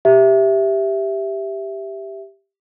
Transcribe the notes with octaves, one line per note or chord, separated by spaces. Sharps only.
G4 E5